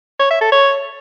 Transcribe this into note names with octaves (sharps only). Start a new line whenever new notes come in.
C#5
E5
A4
C#5